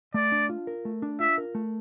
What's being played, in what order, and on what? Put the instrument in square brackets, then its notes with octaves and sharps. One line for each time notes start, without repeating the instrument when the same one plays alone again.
[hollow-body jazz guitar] A3 [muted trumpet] D5
[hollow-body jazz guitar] D4
F4
A#4
A3
D4
[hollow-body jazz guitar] F4 [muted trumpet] E5
[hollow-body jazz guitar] A#4
A3